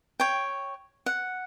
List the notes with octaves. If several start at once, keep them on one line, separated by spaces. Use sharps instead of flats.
C#5 G5
F#5